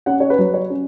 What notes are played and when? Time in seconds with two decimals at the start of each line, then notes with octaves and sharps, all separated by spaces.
0.06 C#4 F#5
0.20 C#5
0.30 B4
0.39 F#3
0.54 C#5
0.70 C#4